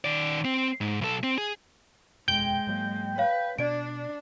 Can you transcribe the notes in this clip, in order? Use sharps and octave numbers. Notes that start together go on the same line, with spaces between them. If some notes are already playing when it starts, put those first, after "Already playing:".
D#3 D5
C4
G#2
B1 A4
C4
G#4
D#1 F2 B2 G#3 G5 G6
G#2 F#3 A#3
B4 C#5 F5
B2 D4 D5 D7